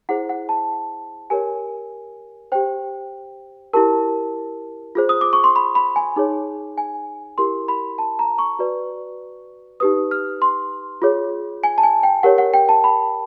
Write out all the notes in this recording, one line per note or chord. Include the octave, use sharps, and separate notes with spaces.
E4 G#4 C5 F#5
F#5
A5
G4 A#4 C#5 G#5
G4 C5 G5
E4 G4 A#4 A5
F4 G#4 C5
D#6
D6
C#6
C6
B5
B5
G#5
D#4 G#4 C#5
G#5
E4 G4 A#4 C6
B5
A5
A#5
C#6
F#4 B4 D5
D#4 G4 B4 D#6
F6
C6
F4 G#4 C#5
G#5
A5
G#5
G5
G4 A#4 C#5 F#5
F#5
G5
A5
B5